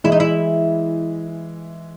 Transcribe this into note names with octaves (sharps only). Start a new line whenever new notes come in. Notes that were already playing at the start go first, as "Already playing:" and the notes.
E3 G#3 E4
D#4
E4